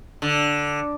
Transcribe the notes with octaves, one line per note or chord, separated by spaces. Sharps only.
D3